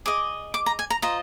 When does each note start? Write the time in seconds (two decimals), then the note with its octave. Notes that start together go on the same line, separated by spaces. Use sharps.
0.06 G#4 D#5 D6
0.54 D6
0.66 A#5
0.79 G#5
0.90 A#5
1.02 F4 C5 D#5 A#5